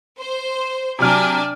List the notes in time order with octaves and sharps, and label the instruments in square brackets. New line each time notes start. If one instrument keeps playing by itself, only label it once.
[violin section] C5
[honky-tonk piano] C3 F#3 F6 [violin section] D4 D5 G#5